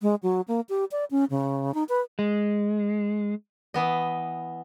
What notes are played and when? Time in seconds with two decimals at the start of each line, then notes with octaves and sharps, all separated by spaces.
0.02 G#3
0.23 F#3
0.48 A#3
0.69 G4
0.91 D5
1.11 C#4
1.30 C#3
1.74 D#4
1.89 B4
2.19 G#3
3.74 E3 B3 D#5